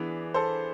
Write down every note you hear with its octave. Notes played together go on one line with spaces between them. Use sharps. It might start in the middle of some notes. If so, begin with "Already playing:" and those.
Already playing: E3 B3 D4 G#4
A4 C5